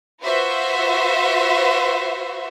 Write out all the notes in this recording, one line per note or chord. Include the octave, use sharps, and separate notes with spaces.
F4 F#4 B4 C5 E5